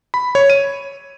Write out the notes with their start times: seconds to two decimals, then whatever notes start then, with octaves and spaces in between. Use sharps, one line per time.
0.14 B5
0.35 C#5
0.50 D#7